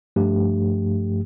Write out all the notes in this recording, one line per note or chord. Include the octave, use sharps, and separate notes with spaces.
G2 F3 A3 G4